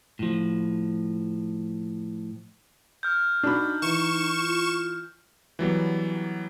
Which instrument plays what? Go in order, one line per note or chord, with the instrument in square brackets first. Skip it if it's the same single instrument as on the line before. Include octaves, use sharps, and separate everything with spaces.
[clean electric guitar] A2 F3
[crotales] F6 G6
[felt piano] D4 F#4 B5 [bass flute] D#4
[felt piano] E3 [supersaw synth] C#6 E7
[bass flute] F4
[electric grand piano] E3 F#3 G3 B3